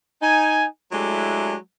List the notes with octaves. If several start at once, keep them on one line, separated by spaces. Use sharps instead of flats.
D#4 G#5
F#3 G#3 A3 D4 E4 G4